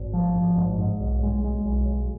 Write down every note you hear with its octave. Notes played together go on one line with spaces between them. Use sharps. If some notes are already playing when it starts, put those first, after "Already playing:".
Already playing: G#1
F3
G#1
G#2
G#2
B1
G#3
G#3
B1
B1